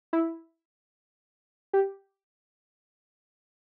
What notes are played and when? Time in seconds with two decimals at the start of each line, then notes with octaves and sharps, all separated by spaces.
0.13 E4
1.73 G4